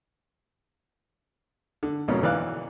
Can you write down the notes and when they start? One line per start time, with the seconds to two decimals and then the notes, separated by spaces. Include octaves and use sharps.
1.83 D3
2.08 F2 G#2 B2 A#3 C#4
2.22 B1 E3 D5 F5 F#6